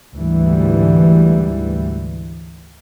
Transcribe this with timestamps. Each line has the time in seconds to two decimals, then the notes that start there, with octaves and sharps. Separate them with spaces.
0.15 D2 G#2 E3 G3